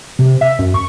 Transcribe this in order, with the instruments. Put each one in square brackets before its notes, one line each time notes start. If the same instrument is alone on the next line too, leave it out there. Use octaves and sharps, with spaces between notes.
[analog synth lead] C3
E5
F#2
C#6